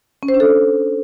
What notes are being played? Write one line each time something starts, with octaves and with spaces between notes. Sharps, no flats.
C#4
C5
D4
A4